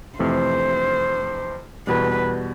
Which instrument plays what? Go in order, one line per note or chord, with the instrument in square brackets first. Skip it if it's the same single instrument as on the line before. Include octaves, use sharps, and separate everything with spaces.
[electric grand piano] F2 C3 E3 A3 [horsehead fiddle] C5
[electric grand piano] E2 B2 G3 [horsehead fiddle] B4